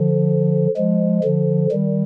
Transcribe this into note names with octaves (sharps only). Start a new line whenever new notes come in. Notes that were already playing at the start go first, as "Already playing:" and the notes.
Already playing: D3 F3
F3 G#3
D3 F3
D#3 G3